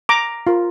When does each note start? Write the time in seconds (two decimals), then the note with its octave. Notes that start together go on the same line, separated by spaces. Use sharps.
0.09 A#5 D6
0.47 F4 A#4